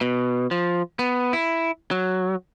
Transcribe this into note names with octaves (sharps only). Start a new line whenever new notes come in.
B2
F3
B3
E4
F#3